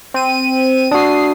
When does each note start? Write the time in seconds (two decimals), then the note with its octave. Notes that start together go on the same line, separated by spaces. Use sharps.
0.14 C4 D#7
0.91 D4 F#4 D#6 C7